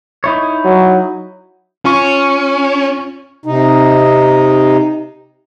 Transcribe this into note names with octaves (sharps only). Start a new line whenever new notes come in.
D#4 E4 C#5
F#3
C#4 F4 C#6
C3 D#4